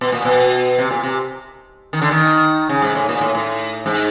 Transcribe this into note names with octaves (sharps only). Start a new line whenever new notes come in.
B2
A#2
B2
C3
A#2
C3
D#3
D3
D#3
C#3
G#2
A2
A#2
A2
A2
G#2